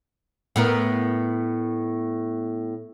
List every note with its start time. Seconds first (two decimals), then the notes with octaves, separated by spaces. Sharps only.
0.56 A2 B3 A#4